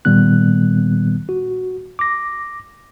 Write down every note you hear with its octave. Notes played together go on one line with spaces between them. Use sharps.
A#2 D#3 G3 B3 F#6
F#4
D6 A#6